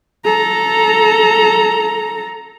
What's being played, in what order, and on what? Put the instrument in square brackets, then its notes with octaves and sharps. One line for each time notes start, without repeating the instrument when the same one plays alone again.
[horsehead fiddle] A4 A#5